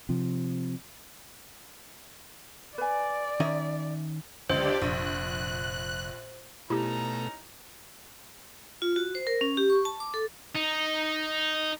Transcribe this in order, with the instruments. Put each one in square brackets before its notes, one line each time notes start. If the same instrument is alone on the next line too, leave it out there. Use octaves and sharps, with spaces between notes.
[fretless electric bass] C3 F3
[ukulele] B4 G#5 [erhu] D5
[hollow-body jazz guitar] D#3 C#4 D#5 [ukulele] E5
[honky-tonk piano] C#2 [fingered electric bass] D3 E3 F#3 [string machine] D4 G4 D5 [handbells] C5
[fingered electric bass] F1 F2 [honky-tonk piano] A#1 [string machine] F#6
[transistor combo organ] B2 A3 [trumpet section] C#4 D#4 A#5 [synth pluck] E4 G4
[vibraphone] F4
F#4
C5
A#4
C#4
G4
C#6
A5
D6
A4
[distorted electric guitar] D#4